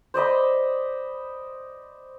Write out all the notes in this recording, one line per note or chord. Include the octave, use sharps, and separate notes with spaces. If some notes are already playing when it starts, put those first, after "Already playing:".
C5 D5 D#5 B5